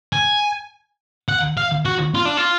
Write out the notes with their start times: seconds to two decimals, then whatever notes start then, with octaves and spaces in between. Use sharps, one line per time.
0.13 G#5
1.29 F#5
1.57 F5
1.85 F#4
2.14 F4
2.25 D4
2.37 F4